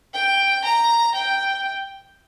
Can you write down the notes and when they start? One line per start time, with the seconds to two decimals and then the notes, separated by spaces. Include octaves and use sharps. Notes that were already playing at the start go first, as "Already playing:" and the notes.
0.14 G5
0.64 A#5
1.15 G5